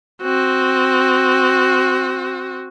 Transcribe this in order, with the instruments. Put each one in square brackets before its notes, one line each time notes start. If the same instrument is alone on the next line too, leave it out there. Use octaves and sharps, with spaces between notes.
[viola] C4 F#4